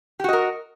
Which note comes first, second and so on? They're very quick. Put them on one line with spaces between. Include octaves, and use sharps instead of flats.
G4 F#4 D#5 A#4